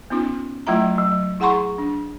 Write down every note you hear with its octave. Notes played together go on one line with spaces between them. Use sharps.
B3 C#4 D#4 F4
F#3 A3 E4 F4 E5 A#5
F#3
E4 G#4 F#5 A#5 C6 C#6
D4